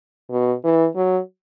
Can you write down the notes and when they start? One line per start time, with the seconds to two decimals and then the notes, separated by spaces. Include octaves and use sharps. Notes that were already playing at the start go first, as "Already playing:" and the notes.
0.31 B2
0.64 E3
0.96 F#3